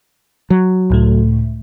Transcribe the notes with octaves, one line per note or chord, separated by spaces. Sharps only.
F#3
C#2 A2 A3